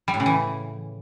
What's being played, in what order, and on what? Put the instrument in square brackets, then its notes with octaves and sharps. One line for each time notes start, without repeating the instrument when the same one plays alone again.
[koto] G3
A2
C#3
E3